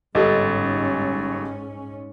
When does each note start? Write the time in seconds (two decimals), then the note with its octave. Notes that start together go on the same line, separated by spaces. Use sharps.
0.15 G1 G#2 C#4 G4 A4 D#5